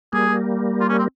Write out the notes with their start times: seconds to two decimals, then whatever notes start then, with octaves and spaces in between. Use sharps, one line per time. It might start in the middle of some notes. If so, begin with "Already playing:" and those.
0.13 G3 A#3 G#4
0.81 F4
0.89 C#4
0.98 C4